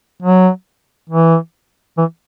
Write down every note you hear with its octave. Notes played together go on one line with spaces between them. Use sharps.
F#3
E3
E3